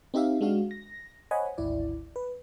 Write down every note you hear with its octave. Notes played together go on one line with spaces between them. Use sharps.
C4 D#4 G4 E5 F5
G#3 D4 F#4 F5
A#6
C5 C#5 D#5 F#5 G#5 B5
G#1 D2 E4 D5
B4